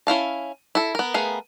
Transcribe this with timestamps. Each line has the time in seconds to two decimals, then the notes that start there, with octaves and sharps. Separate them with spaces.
0.07 C#4 E4 F5 A5
0.75 E4 A4
0.95 B3 A#4
1.14 A3 B3 G#4 A#4 F5